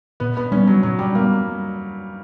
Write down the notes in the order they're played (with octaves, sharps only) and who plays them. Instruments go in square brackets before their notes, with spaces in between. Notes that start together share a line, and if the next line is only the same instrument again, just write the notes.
[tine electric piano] A#2 [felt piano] B3
[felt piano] B3
[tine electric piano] G3 B3 [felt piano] C#4
[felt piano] F#3
[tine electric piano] A#2 [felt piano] F#3
[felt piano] G3
[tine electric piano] G3 B3 [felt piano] A#3